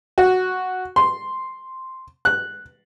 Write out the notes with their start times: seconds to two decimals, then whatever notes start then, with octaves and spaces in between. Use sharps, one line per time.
0.18 F#4
0.96 C6
2.25 F#6